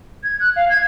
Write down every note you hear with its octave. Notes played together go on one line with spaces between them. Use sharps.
G#6
F#6
F5
G#6